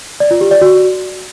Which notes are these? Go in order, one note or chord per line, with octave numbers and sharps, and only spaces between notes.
D5
F4
G4
D5
F#4